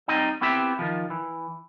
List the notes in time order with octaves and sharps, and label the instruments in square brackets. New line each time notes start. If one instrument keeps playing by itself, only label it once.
[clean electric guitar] G3 C4 D#4 D#5
B3 C4 E4 G4 E5
D#3 F3
E3